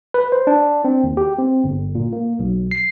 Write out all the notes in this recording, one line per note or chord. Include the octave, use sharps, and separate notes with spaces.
B4
C5
D4
C4
D#2
G4
C4
G1
A#2
A#3
B1
C7